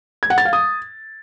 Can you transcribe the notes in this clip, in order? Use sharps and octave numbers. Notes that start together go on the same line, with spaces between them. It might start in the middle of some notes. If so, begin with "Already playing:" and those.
G#6
F#5
A6
F5
D#6